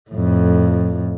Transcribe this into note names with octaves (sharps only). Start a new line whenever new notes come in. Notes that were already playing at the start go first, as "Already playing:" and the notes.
F2 A2